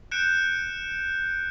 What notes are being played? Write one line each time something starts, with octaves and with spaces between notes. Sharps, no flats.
F#6 G6 C#7 D7 E7